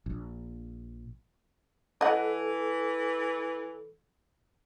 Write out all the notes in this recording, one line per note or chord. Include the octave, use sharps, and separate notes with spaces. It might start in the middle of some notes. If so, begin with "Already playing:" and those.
A#1
E3 A4 D#5 F#5